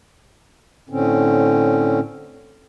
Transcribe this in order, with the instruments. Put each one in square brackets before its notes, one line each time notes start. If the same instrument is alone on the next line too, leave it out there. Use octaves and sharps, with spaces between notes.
[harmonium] A2 D3 C4 C#4